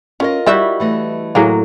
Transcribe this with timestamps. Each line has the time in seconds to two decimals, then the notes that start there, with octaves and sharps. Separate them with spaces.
0.20 C#4 F4 A#4 D#5
0.46 G3 E4 F#4 G4 E5
0.80 E3 A3 D#5
1.35 A2 F#3 A#3 G#4 F5